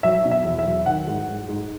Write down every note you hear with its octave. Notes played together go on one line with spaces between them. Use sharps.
F#3 E5
B2
E5
E2
E5
F#3
D#3 F#5
G#2
G#2
G#2